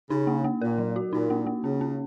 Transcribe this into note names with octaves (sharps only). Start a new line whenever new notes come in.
C#3 D#4
A#3
A#3
A#2 A#4
F#3
F#4
A#2 D#4
A#3
A#3
C#3 C#4
C#4